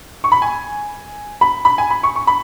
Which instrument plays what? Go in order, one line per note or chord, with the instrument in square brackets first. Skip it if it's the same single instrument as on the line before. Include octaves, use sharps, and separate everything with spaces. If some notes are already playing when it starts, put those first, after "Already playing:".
[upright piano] C#6
B5
G#5
B5
B5
G#5
B5
C#6
C#6
B5